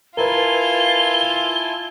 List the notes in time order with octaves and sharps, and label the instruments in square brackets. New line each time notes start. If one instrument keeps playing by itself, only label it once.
[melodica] E4 G#5 A5 [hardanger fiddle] F4 [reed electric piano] A#4 B4 [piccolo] G7